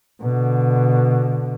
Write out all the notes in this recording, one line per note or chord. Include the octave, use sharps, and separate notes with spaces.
B2 D3